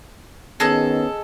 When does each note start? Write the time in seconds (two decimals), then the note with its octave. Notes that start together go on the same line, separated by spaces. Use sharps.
0.60 D#3 B3 C#4 G#4 A4 D#5